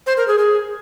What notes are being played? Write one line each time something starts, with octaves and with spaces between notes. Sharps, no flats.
C5
A#4
G#4
G#4